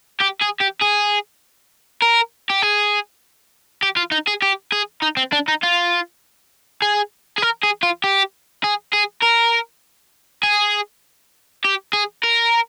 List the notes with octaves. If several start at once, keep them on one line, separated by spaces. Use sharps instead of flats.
G4
G#4
G4
G#4
A#4
G4
G#4
G4
F4
D#4
G#4
G4
G#4
D#4
C4
D4
D#4
F4
G#4
G#4
A#4
G#4
F4
G4
G#4
G#4
A#4
G#4
G4
G#4
A#4